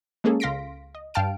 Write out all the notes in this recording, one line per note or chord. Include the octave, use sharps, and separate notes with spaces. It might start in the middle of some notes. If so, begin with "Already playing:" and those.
G#3 A#3 C#4 G#4 A4
C#2 F5 C6 A#6 B6 D7
D#5
G2 F5 G5 A5 F6 D7